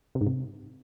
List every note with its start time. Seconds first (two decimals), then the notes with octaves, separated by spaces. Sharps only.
0.15 C3
0.21 G#2
0.27 C3